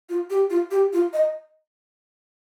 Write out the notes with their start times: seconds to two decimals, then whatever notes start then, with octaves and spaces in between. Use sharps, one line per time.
0.09 F4
0.30 G4
0.50 F4
0.71 G4
0.93 F4
1.13 D#5